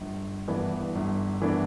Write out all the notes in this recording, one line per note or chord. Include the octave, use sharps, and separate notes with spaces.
G1
G2 E3 B3 D4
G1
E3 B3 D4